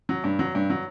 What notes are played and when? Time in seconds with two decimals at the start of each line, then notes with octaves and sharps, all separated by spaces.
0.09 F#3
0.24 G2
0.39 F#3
0.55 G2
0.70 F#3